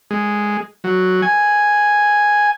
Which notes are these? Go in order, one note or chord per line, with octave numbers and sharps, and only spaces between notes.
G#3
F#3
G#5